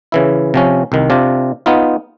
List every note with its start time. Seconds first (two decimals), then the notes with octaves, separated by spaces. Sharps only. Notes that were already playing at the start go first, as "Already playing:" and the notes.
0.12 C#3 E3 E4
0.54 C3 F3 C#4
0.92 C2 D#3
1.10 C3 D4 F4
1.66 B3 D#4 F4